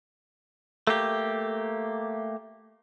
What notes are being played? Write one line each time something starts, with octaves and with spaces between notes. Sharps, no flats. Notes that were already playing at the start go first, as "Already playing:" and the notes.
A3 A#3 G4